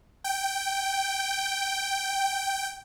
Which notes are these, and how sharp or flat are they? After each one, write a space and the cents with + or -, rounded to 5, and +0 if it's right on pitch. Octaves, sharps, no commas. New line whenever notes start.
G5 -5